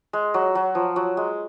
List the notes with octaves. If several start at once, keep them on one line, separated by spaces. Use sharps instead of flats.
G#3
F#3
F#3
F3
F#3
G#3